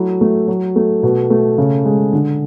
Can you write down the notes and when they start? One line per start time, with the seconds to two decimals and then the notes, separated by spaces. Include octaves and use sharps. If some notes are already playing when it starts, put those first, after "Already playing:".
Already playing: F#3 A3 E4
0.21 A3
0.48 F#3
0.76 A3
1.03 B2
1.30 A3
1.58 C#3
1.86 G#3
2.13 D3